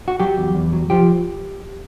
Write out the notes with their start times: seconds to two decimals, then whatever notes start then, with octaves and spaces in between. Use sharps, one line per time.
0.08 F#4
0.20 F#3 G4
0.38 E2
0.55 E2
0.73 F#3
0.90 F3 G4